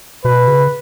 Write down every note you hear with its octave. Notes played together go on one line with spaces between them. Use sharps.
B2 B4
C#3